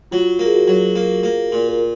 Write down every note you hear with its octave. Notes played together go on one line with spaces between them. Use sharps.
F#3 F4
A#3
G#4
F#4
F#3
A#3
A#3
A#2
A#4